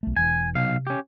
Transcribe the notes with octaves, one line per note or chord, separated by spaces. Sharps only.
B1 A3
E1 E3 G#5
B1 C3 F5
C#4 G4